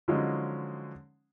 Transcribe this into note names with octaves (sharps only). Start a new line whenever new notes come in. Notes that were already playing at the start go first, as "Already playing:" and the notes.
D3 F3 F#3 G#3 C#4 D#4